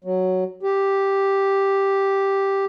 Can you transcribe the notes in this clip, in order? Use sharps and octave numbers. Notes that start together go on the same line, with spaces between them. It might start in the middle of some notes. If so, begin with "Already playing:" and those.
F#3
G4